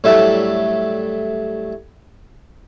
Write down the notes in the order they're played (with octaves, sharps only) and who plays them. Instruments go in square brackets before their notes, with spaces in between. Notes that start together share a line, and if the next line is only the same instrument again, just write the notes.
[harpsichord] A2 F#3 G3 A3 D4 E4